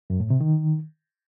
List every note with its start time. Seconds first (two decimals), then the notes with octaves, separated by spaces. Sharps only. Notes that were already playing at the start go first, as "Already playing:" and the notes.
0.10 F#2
0.20 A2
0.30 C3
0.41 D#3